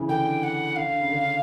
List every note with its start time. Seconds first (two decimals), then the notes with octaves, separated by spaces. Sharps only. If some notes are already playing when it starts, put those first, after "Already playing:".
Already playing: C#3 E3
0.09 D3 G5
0.43 F#5
0.76 D3 F5
1.01 C#3
1.10 D3